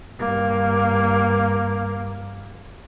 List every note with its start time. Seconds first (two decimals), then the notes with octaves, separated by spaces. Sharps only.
0.19 G2 A#3